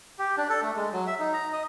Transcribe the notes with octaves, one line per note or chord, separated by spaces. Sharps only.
G4
D4
A4
A3
G#3
F#3
E5
D#4
A#5
D#5